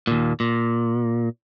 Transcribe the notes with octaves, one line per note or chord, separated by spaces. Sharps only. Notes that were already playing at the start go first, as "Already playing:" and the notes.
D#2 A#2
A#2